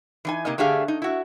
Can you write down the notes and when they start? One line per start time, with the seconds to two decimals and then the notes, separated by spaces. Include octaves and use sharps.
0.25 E3 D#4 G#5
0.45 C3 A#3 D#4 D#5
0.58 D3 A3 G4 G#4 F5
0.88 D#4
1.02 E4 F#4